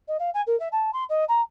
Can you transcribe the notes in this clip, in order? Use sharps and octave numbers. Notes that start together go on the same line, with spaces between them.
D#5
F5
G#5
A#4
E5
A5
C6
D#5
A#5